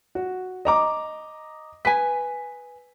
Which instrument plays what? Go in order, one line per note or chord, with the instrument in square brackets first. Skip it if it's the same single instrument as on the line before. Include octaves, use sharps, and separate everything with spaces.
[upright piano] F#4
D#5 A#5 D6
[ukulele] B4 G#5 [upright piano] B6